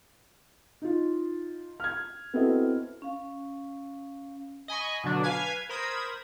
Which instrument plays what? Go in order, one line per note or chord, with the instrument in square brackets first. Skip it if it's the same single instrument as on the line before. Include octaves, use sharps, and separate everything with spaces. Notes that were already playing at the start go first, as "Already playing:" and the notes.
[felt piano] D#4 F4
F6 G#6
B3 C4 E4 F#4 A4 D#5
[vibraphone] C#4 F5
[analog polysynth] D#5 G#5 B5 C#6
B2 D3 F#3 D4
B4 F5 G#5 G#6 B6
A#4 C5 B5 D#6 G#6 E7